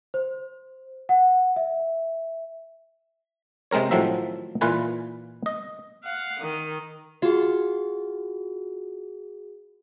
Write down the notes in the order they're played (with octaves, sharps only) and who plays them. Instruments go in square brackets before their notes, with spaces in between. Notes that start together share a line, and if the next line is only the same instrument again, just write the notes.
[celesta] C5
F#5
E5
[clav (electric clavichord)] C3 G#3 C4 A#4 C#5
A2 D#3 F3 F#3 C4 E5
A#2 E3 F4 B4 G#5
D#5
[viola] F5 F#5
D#3
[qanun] F4 [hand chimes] F#4 G#4